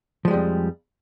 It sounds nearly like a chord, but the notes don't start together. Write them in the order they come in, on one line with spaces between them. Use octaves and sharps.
F3 G#3 G3 F2